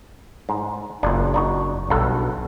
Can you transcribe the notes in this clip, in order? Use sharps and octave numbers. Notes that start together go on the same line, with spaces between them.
G#2
F#1 A#2 D4
D4 D#4 F#4
B1 G2 A4 F#5